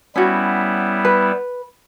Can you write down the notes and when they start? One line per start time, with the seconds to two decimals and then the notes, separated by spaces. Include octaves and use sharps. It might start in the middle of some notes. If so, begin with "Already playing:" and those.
0.16 G3 B3 C#4 E4 F#4
1.05 B4